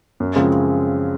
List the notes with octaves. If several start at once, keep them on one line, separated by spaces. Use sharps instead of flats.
F#2
C#3 F3 G#3 C4